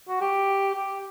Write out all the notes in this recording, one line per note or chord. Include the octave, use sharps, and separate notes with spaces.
F#4
G4
G4